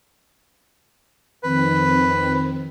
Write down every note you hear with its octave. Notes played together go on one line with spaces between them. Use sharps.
F2 D#3 C4 B4